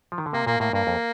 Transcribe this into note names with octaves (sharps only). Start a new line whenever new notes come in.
F3
D#3
D3
C3 A#3
A#2 A#3
A2 A#3
G2 A#3
F2